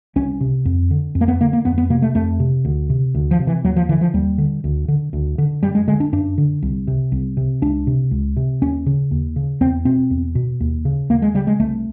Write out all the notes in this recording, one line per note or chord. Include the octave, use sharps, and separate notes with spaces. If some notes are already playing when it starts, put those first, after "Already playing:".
C2 C#4
C3
F2
D3
F2
A#3
B3
D3 A#3
A#3
F2 B3
B3
C3 A#3
A3
F2 A3
C3
D2
C3
D2
F3
C3
E3
D#2 F#3
F3
D3 E3
F3
D#2 G3
D3
D2
D3
D2
D3
F#2 G3
G#3
D3 G#3
D4
F#2 D4
D3
C2
C3
C2
C3
C#2 D4
C3
C#2
C3
D#2 C#4
C#3
D#2
C#3
E2 C4
B2 C4
E2
B2
D#2
C#3
D#2 A#3
G#3
C#3 G3
G#3
C2 A3